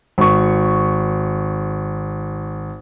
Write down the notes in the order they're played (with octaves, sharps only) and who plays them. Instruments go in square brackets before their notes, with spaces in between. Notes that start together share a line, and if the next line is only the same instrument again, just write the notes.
[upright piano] G#1 C#6